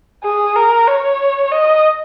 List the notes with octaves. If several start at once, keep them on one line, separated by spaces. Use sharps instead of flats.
G#4
A#4
C#5
D#5